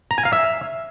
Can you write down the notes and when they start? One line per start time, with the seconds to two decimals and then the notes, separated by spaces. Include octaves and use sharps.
0.11 A#5
0.18 G#5
0.25 F5
0.33 E5